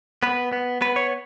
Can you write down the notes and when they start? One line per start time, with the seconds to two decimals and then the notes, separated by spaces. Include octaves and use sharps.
0.23 B3 B4
0.53 B3
0.81 B3 B4
0.96 C#5